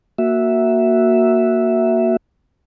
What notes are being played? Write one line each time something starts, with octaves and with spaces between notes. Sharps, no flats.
A#3 F#4 E5